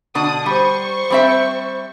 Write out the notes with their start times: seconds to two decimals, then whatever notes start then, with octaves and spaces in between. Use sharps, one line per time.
0.15 B2 D3 D4 D#6
0.46 G3 C5 C#6
1.10 G3 C4 E5